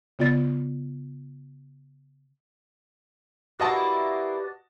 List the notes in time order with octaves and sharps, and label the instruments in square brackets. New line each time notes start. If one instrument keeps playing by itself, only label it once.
[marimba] C#3 B3 F4 D5 A6
[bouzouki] A#3 E4 [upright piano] F#4 D#5 A5 [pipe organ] G4 B4 D5